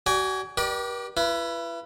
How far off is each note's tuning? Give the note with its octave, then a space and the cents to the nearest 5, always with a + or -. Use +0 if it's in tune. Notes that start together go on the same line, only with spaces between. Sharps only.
F#4 +40 D5 +0 G#5 +0
G4 -20 B4 -45 D5 +20
E4 +40 B4 -5